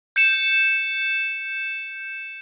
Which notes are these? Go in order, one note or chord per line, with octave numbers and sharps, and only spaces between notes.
G6 C#7 E7